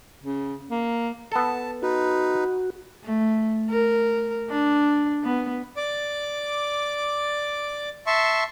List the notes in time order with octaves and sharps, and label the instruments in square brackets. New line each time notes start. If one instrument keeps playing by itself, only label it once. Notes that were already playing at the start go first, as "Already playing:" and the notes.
[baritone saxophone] C#3
A#3
[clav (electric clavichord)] B3 A4 [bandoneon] A5
[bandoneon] D#4 B4 [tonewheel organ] F#4
[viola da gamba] A3
A#4
D4
B3
[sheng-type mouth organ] D5 D6
E5 A5 C6 C#6